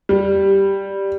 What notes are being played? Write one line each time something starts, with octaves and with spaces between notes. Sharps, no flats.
G3